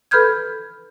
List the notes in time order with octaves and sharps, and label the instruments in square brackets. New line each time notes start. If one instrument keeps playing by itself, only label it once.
[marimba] A4 B4 B5 F6 G6 G#6